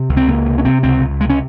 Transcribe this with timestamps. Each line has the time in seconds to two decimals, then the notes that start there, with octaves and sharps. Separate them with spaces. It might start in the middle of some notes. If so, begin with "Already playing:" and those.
Already playing: C3
0.09 C#2
0.17 C4
0.28 C#2 A#3
0.47 C3
0.58 C#4
0.65 C3 C4
0.83 C#2 C4
1.01 C#2
1.20 C3 G#3
1.30 C#4